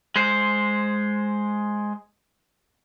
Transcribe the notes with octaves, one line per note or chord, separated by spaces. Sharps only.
G#3 C5